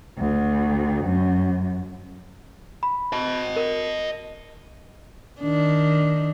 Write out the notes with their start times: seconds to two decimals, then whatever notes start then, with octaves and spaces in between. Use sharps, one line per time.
0.17 D2
1.04 F#2
2.83 B5
3.13 D#5 A5
3.56 A#4
5.41 D#3 D4